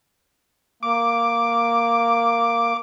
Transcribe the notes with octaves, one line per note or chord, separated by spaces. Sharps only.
A#3 D6